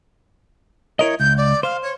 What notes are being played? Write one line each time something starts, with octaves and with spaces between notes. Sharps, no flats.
E4 A#4 C#5 D#5
C#2 G6
D5
C5 F5
C#5